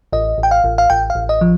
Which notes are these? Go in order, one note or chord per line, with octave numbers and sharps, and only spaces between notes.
A1 D#5
A1
G5
F5
A1
F5
A1 G5
F5
A1
D#5
F3